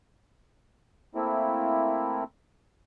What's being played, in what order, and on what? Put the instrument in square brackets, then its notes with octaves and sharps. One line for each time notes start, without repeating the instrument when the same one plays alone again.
[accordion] A3 A#3 C4 E4